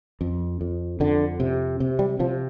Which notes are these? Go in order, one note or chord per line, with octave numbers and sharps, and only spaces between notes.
F2
F2
F2 D3
C3
C3
G3
C3 F3